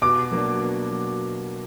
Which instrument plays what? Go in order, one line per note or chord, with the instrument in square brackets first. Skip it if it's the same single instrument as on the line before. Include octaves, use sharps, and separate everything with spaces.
[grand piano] B2 [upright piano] D6
[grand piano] F#3 A#3 D4
B2
F#3